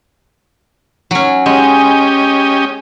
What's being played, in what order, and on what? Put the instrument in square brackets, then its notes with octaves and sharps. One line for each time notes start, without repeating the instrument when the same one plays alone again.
[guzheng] F#3 C#4
[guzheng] G#3 [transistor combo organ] C#4 G4 D#5